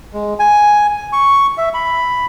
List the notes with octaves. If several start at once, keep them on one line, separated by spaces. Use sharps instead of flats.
G#3
G#5
C#6
E5
B5